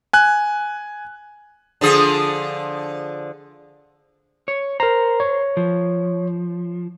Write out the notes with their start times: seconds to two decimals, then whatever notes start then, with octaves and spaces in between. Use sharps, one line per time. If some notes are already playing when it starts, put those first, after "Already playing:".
0.13 G#5 F#6
1.81 D3 F3 G#4
4.48 C#5
4.80 A#4 C5 A#5
5.20 C#5
5.57 F3